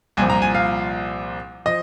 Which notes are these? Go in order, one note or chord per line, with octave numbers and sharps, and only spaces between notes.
C2 A#2 F3 G#5
A#5
G#5
F5
F3 D#5